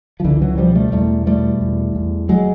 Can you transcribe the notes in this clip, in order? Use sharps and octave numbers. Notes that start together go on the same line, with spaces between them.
F3
C#2 D3 E3
E3 F#3
B2 F3 G3
G3 A3
E2 G3 A3
B2 G3 A3
E2
E2
F#3 G#3